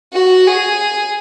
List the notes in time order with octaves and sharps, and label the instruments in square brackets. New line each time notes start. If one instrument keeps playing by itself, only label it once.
[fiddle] F#4
G#4